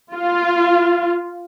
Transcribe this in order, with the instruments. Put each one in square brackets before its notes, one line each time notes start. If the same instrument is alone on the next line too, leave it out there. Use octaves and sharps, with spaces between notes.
[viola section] F4